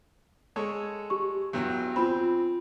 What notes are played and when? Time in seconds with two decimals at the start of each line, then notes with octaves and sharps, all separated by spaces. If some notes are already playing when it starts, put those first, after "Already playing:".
0.56 G#3 A4 C#5
1.10 G4 C#6
1.53 E2 G2 F#3
1.96 C4 F4 B5